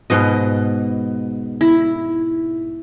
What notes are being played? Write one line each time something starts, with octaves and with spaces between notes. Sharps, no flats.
G#2 B2 D#5
E4